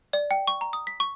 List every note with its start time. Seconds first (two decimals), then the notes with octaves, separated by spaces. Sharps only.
0.13 D5
0.31 G5
0.48 C#6
0.61 A#5
0.73 D#6
0.87 B6
1.00 C#6